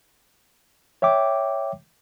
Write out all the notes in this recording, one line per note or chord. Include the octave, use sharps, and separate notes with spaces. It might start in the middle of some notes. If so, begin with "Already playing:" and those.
C#5 E5 G5 D6